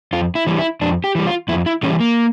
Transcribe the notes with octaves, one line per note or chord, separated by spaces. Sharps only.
F2 F4
E4
E3 G3
E4
F2 D4
G4
E3 G3
F4
F2 E4
E4
E3 G3 C#4
A#3